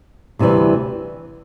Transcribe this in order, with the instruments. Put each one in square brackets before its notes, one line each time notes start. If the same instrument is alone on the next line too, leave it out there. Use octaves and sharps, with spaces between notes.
[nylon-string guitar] D2 C3 E3 G3